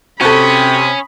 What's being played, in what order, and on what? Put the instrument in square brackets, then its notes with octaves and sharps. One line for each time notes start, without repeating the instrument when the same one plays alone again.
[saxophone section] C3 [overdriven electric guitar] C#4 [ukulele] F#4 A4 [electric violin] B5 D#6